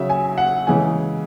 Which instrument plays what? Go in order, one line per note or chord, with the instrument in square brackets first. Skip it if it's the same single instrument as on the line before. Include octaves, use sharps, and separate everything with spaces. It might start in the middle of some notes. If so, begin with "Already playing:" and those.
Already playing: [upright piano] C#3 F#3 E5
G#5
F#5
C#3 E3 G#3 G#5